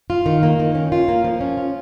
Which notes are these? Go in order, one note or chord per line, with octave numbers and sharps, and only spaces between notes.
F4
D#3
A#3
D#3
C#4
F4
A#3
F3
C#4
F4